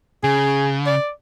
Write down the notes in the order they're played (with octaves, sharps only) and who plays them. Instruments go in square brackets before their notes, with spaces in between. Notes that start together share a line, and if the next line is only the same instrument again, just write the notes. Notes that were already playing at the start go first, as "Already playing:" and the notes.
[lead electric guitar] C#3 [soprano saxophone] G#4
[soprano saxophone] D5